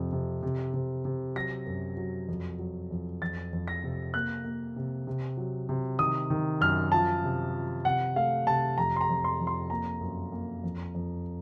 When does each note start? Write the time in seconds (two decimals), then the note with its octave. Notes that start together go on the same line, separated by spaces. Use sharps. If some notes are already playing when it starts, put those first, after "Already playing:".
Already playing: F2 C3
0.13 C3
0.43 C3
0.74 C3
1.05 C3
1.36 F#3 A#6
1.66 F#2
1.97 F#3
2.28 F2
2.59 F#3
2.91 F2
3.21 F2 A6
3.53 F2
3.68 A#6
3.84 C3
4.14 A#3 F#6
4.45 A#3
4.76 C3
5.07 C3
5.37 F#3
5.69 C3
5.99 D#3 D#6
6.30 D#3
6.61 F#2 F6
6.92 F3 A5
7.23 C3
7.54 F3
7.85 C3 F#5
8.16 A3 F5
8.47 C3 A5
8.78 F2 A#5
8.96 C6
9.01 A#5
9.09 F2
9.24 C6
9.40 F2
9.47 C6
9.70 A#3 A#5
10.01 F#2
10.32 A#3
10.64 F2
10.95 F2